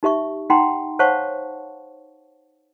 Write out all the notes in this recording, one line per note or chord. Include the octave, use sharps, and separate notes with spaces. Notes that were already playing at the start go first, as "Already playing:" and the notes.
D#4 G4 E5 C#6
D#4 F#5 G5 A#5 C6
C5 C#5 F5 F#5 A5 C#6